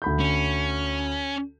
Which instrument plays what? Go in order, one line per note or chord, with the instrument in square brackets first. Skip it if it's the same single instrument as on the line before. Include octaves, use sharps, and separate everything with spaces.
[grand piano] D2 B5 G6
[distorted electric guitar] C#4